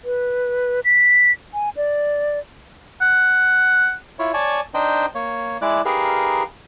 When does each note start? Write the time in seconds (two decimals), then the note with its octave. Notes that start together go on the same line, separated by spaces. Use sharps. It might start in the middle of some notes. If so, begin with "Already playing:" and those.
0.05 B4
0.85 B6
1.54 G#5
1.77 D5
3.01 F#5
4.19 E4 F4 C#5
4.34 C#5 D5 G#5 A5
4.74 D4 D#4 C5 D#5 G5
5.15 A#3 C#5
5.62 G#3 E4 D5 D6 F#6
5.85 D#4 G4 G#4 A#4 B4 F5